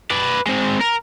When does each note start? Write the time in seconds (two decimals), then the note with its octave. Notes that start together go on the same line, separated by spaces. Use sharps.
0.11 B4 D5
0.47 G#3 C4
0.81 A#4